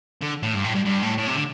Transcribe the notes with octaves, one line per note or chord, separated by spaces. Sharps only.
D3
A2
G2
A2
G2
G2
A2
A2
C3
D3